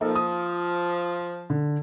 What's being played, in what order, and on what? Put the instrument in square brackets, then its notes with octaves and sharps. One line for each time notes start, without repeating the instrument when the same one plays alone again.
[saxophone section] F3 [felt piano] A#3 D#4 A4
[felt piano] D#6
D3